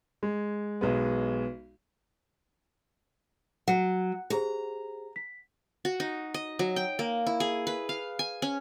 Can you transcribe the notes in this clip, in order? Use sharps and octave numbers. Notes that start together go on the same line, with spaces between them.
G#3
B1 G#3 B3
F#3 F#5 C#7
G4 G#4 C5 A#5
B6
F#4
D#4
D#5
F#3
G5
A#3
E4
G#4
B4
F5
G#5
C#4